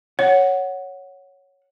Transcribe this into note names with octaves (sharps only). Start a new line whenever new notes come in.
C#5 F#5